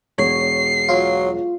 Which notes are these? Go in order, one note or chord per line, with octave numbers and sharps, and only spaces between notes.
E1 C#5 C7
F#3 F4